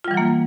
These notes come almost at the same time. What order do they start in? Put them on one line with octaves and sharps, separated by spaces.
F4 G3 E3 F#3 A#3